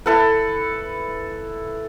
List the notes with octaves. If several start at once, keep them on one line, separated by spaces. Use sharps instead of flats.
E4 A4 B4